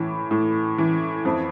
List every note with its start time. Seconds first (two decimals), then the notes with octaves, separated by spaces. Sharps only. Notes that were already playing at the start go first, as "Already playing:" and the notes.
Already playing: A2 E3
0.31 A2
0.78 E3
1.25 F2